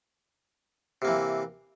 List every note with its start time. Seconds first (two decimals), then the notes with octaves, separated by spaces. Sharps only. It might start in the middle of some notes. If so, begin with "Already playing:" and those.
1.02 C3
1.05 A#3
1.08 E3